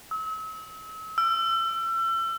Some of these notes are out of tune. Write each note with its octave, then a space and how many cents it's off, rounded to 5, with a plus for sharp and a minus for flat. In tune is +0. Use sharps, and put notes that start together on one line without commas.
E6 -40
E6 +35